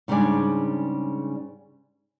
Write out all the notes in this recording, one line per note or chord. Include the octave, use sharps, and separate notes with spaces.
G#2 C#3 G3 D4 D5 G#5